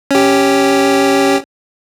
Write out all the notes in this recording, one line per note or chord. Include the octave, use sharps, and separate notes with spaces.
C#4 G4